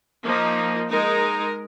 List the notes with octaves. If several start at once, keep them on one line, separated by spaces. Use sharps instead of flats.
F3 A#3 D#4
G#3 D#4 A#4